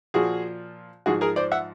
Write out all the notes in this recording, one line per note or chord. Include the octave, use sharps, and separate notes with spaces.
A#2 F3 F#4 G#4
G#2 F3 F#4 G#4
G#4 A#4
C5 D5
E5 F#5